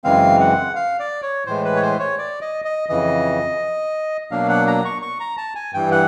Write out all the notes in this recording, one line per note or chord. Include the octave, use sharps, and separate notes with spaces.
F#2 C#3 E3 G#3 C4 F5
F#5
F5
D5
C#5
A2 E3 G#3 C5
B4
C#5
C5
C#5
D5
D#5
D#5
F2 C#3 E3 D#5
B2 F#3 A#3 D4 F5
F#5
A#5
C#6
C#6
A#5
A5
G#5
G2 E3 G3 G5
F#5